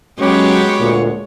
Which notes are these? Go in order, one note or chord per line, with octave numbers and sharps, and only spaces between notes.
F#3 G#3 B3 C#4 F#4 G4 C#5
D2 A#2